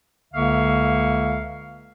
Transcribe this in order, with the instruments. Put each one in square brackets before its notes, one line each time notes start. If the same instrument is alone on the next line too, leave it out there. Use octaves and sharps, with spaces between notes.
[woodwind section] C#2 D3 A#3 E5 F5 C#6